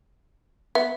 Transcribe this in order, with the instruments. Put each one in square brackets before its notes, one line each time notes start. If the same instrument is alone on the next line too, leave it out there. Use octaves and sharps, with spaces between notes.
[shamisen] B3 [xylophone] E5